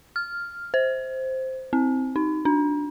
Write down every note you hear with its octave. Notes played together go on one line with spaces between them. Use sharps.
F6
C5
C4
D#4
D4